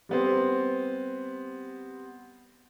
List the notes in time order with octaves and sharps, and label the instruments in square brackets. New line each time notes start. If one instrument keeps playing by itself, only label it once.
[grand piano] G3 B3 C4